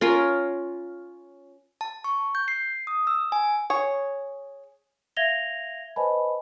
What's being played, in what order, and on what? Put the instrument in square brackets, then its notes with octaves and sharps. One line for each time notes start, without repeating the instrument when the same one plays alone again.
[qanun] C#4 F4 A#4
[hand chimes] A5
C#6
G6
C7
D#6
E6
G#5
[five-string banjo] G#4 C#5
[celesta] E5 F5 G#6 A#6 F7 G7
B4 C5 D#5 G#5 A5 B5